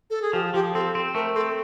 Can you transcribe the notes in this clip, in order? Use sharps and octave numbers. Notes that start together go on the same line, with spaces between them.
A4
G#4
F3 G4
F3 G4
C4 A4
C4
A3 A#4
C4 A4